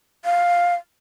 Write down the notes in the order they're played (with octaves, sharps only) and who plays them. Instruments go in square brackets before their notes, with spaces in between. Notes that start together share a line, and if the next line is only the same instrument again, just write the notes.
[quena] F5